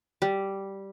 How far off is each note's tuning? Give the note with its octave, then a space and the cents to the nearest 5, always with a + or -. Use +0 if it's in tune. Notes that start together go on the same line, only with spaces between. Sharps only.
G3 -5